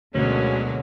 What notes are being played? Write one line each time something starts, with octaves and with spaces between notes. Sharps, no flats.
D2 B2 D3 F#3 G#3 A#3 C#4